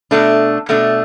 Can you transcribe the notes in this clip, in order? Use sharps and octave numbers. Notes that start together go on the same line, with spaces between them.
B2 A3 D4
B2 A3 D4